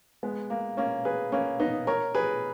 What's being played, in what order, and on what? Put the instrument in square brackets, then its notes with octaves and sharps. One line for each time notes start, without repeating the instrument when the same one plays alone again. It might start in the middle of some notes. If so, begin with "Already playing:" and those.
[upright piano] G#3 B3
A#3
A#3 C#4
G#4 B4
A#3 C#4
B3 D#4
A#4 C#5
G#4 B4